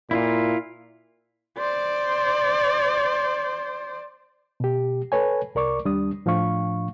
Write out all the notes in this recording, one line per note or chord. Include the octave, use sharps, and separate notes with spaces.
A#2 E4 F4
C5 D5
B2 G4
A4 B4 C#5 G#5
C2 A#4 D5 C#6 D6
D#2 G3 D4 D#6
A2 F3 D4 F5 C#6